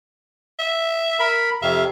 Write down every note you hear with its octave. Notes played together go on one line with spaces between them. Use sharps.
E5
A#4 B5
F2 C3 E5 F5